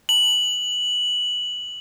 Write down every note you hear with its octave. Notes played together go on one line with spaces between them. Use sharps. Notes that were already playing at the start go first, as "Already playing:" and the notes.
F#7